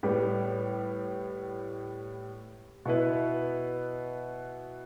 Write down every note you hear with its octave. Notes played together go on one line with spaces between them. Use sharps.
A2 G3 B3 G4
B2 B3 E4 B4